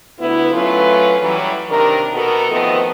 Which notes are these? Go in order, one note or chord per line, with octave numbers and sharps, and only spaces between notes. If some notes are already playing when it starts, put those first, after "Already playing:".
D2 B3 E4
F#3 A3 C#4 F4 B4
E3 F#3 G3
C3 D#3 D4 A#4
B2 B3 F#4 A4 A#4
D#3 F3 A3 B3 C4 D#5